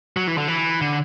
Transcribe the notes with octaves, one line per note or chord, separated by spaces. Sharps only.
F#3
E3
D3
E3
D3